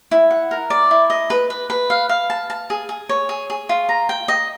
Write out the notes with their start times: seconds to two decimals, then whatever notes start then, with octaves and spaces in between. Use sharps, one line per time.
0.11 E4
0.31 F#5
0.51 A#4
0.70 D5
0.91 E4
1.10 D#5
1.30 B4
1.50 B4
1.70 B4
1.90 F5
2.09 F5
2.30 A5
2.50 A5
2.70 G#4
2.89 G#4
3.09 C#5
3.29 G#4
3.50 G#4
3.69 F4
3.89 A#5
4.09 G5
4.28 D#5